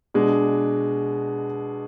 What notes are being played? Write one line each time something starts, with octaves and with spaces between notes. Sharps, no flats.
B2 G#3 D4